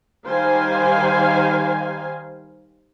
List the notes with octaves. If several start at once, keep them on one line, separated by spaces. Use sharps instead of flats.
D#3 G3 C5 F5 G#5